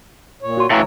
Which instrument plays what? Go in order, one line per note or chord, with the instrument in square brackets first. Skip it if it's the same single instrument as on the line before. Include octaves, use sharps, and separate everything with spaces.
[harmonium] A#2 C#5
[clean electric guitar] F#4 C6
[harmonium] D2 C#5 [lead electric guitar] A2 E3 [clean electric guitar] F5 A#5